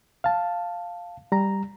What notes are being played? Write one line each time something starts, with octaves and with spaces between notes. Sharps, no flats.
F5 A5
G3 A#5